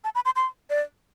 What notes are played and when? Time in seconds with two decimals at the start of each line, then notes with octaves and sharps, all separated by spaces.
0.04 A5
0.15 B5
0.25 C6
0.36 C6
0.70 D5